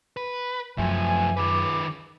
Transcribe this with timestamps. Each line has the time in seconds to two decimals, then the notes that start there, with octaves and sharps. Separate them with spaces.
0.17 B4
0.78 F#2 B2 F3 A3 E5 G#5
1.37 C#2 D#3 B4 D6